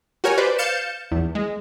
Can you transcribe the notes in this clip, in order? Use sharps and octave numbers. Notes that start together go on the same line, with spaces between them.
F#4 G4 A#4 C#5 G#5
B4 C5 D5
F5 G6 A6 C#7 E7
E2
G#3